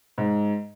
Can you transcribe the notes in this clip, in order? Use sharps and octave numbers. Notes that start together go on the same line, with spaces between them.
G#2